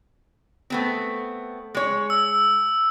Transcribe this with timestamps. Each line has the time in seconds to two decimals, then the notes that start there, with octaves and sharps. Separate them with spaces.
0.70 A3 B3 C4
1.75 G#3 C#5
2.10 E6